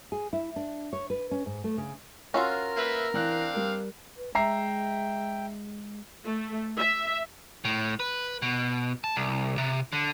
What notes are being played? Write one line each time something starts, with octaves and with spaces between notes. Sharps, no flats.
G#4
E4
D4
C#5
B4
C#4
G#2
A3
C#3
C#4 F4 F#4 A#4 C6 E6
A#3 B4 E5
E3 C4 D4 F5 F#6
G3 A#4
B4
G#3 E5 G5 A#5 C7
A3
E5
A2
B4
B2
A5
C2
C3
D3